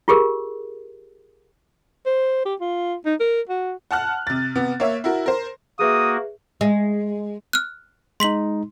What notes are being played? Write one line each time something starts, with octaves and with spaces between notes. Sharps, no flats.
F4 G4 G#4 A#4
C5
G4
F4
D#4
A#4
F#4
F#5 A5 F6 F#6
C3 A6
C3 B3
A#3 C#5 E5
E4 F#4 A#4
A#4 C5
A#3 F#4 G#4 B4 E5 D#6
G#3
F6 F#6
G#3 D#4 C6 B6 F#7